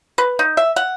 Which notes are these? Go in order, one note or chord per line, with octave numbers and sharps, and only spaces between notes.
B4
D#4
E5
F#5